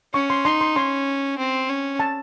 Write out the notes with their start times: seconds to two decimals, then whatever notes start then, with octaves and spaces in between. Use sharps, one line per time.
0.14 C#4 C#6
0.30 C6
0.45 D#4 C6
0.61 C6
0.76 C#4 C6
1.38 C4
1.69 C#4
2.00 A5